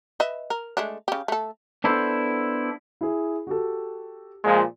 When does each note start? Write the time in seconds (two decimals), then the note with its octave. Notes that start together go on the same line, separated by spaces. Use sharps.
0.20 B4 D#5 E5
0.50 A#4
0.77 G#3 A3 D4
1.08 C#3 G4
1.28 A3 A4
1.84 B3 D4 E4 A4 C5
3.01 E4 G#4
3.47 F#4 G4 A4
4.45 A#2 F3 G#3